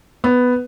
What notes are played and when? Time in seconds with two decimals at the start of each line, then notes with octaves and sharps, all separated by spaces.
0.24 B3